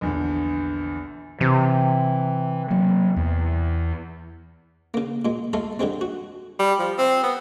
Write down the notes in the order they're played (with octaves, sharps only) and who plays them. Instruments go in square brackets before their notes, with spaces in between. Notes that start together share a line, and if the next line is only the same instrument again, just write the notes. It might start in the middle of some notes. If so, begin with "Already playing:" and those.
[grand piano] A#1 E2 D3
[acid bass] C3 [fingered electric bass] E3
[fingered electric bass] F#3 A#3
E2
[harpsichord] C#3 A#3
A#2 G#3
G#3 A3 A4 F5
D3 G3 G#3 C4
F#4
[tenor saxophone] G3
F3
C4
B3